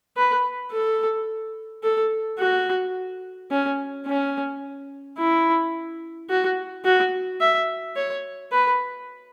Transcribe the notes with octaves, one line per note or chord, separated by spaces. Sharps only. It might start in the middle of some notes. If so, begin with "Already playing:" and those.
B4
A4
A4
F#4
C#4
C#4
E4
F#4
F#4
E5
C#5
B4